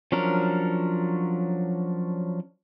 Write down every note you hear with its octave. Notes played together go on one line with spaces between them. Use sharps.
F3 F#3 C#4 D4 A#4